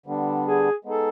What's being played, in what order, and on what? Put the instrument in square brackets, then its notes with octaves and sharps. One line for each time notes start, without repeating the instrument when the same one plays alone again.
[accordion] D3 G3 B3 D4
[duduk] G#4
[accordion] G#3 B3 D#4 G#4 [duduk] A4